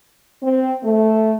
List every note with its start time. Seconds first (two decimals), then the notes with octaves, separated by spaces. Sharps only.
0.42 C4
0.84 A3